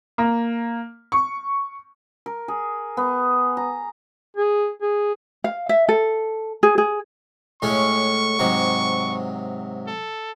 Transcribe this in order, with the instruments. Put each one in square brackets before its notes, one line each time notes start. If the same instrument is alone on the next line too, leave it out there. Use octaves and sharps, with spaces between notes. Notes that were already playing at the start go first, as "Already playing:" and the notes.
[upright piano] A#3
C#6
[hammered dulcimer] A#4
G#4
B3
A#5
[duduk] G#4
G#4
[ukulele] F5
E5
A4
G#4
G#4
[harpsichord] A2 G#3 C#4 [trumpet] C#6
[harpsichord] G#2 C3 F#3
[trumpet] A4